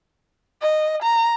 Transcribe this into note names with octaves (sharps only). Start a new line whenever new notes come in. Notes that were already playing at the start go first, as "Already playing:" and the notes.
D#5
A#5